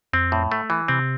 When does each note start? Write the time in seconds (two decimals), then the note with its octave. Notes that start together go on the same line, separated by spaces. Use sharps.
0.13 F2 C4
0.32 A2
0.52 A3
0.70 E3
0.88 C3 C4